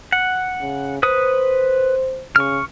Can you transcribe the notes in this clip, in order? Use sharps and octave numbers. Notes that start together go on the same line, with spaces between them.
F#5
C#3
B4 C5 D#6
C#3 C#6 F6